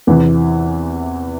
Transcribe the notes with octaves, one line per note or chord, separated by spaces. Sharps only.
E2 C3 E3